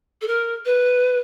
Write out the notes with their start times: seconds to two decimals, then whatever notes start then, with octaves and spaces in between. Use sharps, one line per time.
0.21 A4
0.27 A#4
0.65 B4